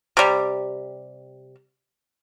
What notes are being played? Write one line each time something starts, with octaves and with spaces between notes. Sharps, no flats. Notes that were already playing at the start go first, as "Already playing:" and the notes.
C3 G3